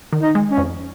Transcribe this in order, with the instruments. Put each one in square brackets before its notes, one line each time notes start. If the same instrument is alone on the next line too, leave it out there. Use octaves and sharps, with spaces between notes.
[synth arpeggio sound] D#3
[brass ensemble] D#4
[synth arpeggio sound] G#3
[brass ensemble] C#4
[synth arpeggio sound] F2